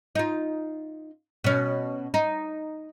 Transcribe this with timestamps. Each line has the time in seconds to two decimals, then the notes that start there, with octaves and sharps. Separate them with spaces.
0.15 D#4 F4
1.44 B2 C#4
2.14 D#4